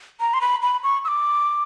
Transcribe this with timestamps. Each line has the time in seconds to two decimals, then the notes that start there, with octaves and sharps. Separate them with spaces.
0.20 A#5
0.34 C6
0.41 B5
0.62 B5
0.84 C#6
1.05 E6
1.08 D6